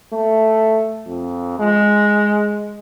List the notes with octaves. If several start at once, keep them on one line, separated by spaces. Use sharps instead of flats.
A3
F2
G#3